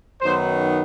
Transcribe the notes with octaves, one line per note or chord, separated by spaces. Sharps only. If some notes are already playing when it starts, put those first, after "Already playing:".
F#2 D#3 F#3 B3 D#4 C5